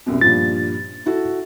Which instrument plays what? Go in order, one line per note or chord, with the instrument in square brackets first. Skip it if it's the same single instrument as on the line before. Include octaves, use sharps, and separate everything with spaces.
[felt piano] C2 F#2 B2
[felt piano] G2 A#2 F3 [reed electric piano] A6
[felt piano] E4 F#4 A4